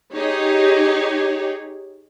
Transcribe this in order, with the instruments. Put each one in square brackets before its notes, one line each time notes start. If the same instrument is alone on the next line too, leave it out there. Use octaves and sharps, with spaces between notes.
[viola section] D#4 G4 G#4 C#5